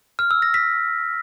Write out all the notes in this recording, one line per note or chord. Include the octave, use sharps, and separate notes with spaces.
F6
E6
A#6
B6